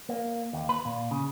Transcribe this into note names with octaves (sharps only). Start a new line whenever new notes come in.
A#3
D#2
B4
A#2
C#3